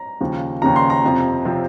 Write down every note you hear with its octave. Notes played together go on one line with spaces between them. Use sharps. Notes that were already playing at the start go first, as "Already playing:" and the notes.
Already playing: A#5
D#2 C#3 F3
D#2 C#3 F3 A#5
C6
A#5
F2 C3 F3 C4
C3 F3 C4